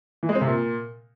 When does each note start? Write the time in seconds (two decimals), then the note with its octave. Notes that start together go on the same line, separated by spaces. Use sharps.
0.23 E3
0.29 G#3
0.35 C4
0.41 C3
0.48 A#2